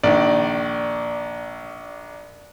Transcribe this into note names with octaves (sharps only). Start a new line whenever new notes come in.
A#1 D#3 D5